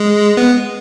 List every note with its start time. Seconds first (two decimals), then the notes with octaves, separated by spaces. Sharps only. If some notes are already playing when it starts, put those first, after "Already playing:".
Already playing: G#3
0.37 B3